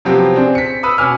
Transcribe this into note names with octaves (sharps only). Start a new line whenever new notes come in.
C3 F3 F#3 B3 C4 G4
C4 D4 G#4
B6 C#7
B4 B5 D#6 E6
B2 C#4 G#5 D6 F6